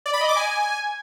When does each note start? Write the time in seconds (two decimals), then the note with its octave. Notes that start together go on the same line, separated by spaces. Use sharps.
0.06 D5
0.13 B5
0.21 D#5
0.29 D6
0.36 G#5